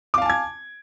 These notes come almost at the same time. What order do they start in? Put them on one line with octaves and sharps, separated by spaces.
D6 F5 A5 G#5 G#6